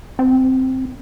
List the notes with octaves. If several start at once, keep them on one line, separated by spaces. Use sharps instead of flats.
C4